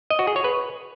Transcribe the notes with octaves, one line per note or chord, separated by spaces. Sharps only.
D#5
F#4
G#4
C#5
B4